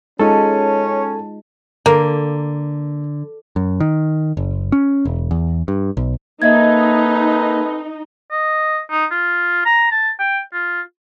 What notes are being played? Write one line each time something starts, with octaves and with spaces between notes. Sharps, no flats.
G#3 C#4 D#4 F4 A4 A5
D3 A#3
F#2
D#3
F#1
C#4
E1
E2
G2
B1
A#3 C4 D#4 A4 B4 D#5 E5 G#6
D#5
D#4
F4
A#5
A5
G5
F4